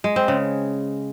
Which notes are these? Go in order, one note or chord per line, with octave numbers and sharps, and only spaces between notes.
G#3
C4
C#3